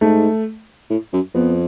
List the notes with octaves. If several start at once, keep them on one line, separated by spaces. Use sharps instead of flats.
G#2 A3
A2
F#2
F2 B3